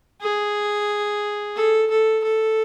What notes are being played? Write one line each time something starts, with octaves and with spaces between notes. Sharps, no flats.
G#4
A4
A4
A4